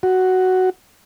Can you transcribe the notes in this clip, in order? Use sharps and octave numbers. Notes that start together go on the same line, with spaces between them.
F#4